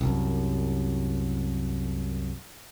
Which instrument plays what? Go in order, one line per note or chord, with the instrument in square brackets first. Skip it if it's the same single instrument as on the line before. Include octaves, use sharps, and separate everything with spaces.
[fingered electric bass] C2 F#2